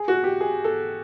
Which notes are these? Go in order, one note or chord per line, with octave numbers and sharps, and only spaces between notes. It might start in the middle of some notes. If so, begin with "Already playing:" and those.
Already playing: G#4
F#4
G4
G#4
A4